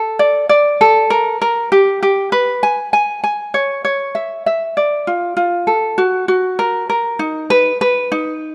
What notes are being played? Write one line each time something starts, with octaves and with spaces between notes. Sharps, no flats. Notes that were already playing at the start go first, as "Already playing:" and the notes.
Already playing: A4
D5
D5
A4
A#4
A#4
G4
G4
B4
G#5
G#5
G#5
C#5
C#5
E5
E5
D5
F4
F4
A4
F#4
F#4
A#4
A#4
D#4
B4
B4
D#4